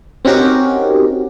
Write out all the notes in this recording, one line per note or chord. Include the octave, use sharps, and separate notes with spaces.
C4 C#4 D#4 F#4 G4 A#4